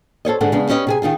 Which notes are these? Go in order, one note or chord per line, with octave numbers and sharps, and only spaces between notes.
A4 C5 C#5 D#5
G#2 D3 G#3 A4 F#5
C#3 G#3 B3 D4
C#4 G4 B4 D#5
C3 G#4 G#5
D#3 D#4 F4 G#4